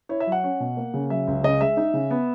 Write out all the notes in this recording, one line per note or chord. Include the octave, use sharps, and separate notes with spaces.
E4 C#5
E5
F#3
F#5
C#4
B2
A#3
C#3
F#3 E5
C#2
C#3 D#5
G#3 E5
D#4
C#3
B3